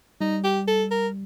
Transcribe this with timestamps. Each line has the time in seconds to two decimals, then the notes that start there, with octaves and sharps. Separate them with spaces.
0.21 G3 D#4
0.44 G4
0.67 A4
0.91 A#4